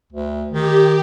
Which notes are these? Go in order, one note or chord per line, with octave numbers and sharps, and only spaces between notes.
D2
D#3 G4